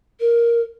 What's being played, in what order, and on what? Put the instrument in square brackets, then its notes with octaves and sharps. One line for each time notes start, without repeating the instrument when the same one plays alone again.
[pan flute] A#4